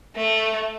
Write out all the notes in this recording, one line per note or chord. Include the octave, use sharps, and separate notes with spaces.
A3